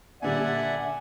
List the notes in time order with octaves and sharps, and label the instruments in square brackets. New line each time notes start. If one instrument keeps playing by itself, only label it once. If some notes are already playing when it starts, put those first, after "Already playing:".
[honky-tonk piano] A#2 D3 G3 [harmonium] D5 E5 F#5 [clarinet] G#5